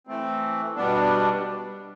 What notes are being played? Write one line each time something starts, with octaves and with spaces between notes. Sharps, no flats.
E3 A3 C4
B2 G3 B3 D4